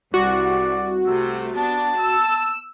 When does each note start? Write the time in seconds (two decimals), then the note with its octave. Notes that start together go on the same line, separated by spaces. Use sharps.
0.14 C2 F#4 D5
1.07 C3 A3 E6
1.57 B3 D4 A5
1.99 E6